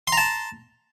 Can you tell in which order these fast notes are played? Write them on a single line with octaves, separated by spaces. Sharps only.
C6 A#5 A5